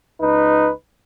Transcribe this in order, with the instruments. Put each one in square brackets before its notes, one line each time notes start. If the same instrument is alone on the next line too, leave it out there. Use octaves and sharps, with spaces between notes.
[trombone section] C#2 D#4 B4